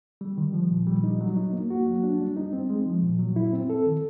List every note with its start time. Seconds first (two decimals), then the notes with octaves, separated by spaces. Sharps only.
0.21 G3
0.38 D#3
0.54 F3
0.71 A#2
0.87 G3
1.04 D#4
1.21 F#3
1.36 D#4
1.53 A#3
1.70 F#4
1.87 F#3
2.03 D4
2.20 G3
2.37 D#4
2.53 C4
2.70 G#3
2.86 F3
3.03 A#2
3.19 F#3
3.36 E4
3.53 C4
3.70 A4
3.86 D#3